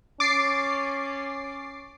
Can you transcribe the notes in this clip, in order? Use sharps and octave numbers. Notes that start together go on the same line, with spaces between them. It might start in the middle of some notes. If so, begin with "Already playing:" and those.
C#4 D6 A6 C7